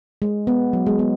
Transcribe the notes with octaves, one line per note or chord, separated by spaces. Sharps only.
G#3
B3
F#3
G#3
B3